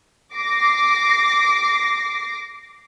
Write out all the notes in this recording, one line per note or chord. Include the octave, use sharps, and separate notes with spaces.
D6 A#6 C7